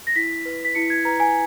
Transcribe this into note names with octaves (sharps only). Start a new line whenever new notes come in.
A#6
E4 B6
B4
B6
E4 C#7
G#6
B4 A#5
G#5